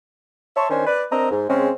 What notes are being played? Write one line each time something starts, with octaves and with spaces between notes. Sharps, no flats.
C#5 E5 A5 C6 C#6
D#3 C#4 D4 C5 G#5
B4 D5
C4 D4 A#4 D#5 A#5
G#2
C#3 G#3 C4 C#4